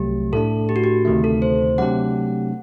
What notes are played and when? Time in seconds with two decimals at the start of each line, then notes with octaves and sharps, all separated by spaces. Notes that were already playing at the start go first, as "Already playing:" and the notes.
Already playing: C2 C3 F#3 A3 G4
0.32 A2 A3 D4 A4
0.69 G4
0.76 F#4
0.84 G4
1.05 D2 C3 D#3 A3
1.24 A4
1.42 C5
1.78 C3 F#3 A3 D4 G4 F#5